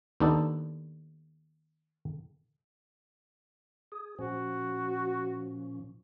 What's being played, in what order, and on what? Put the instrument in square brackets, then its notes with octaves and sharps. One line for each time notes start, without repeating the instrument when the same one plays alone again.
[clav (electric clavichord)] D#2 B3 D4 D#4 A4
[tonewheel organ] G#4
[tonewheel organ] A#2 F3 C#4 [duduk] F#4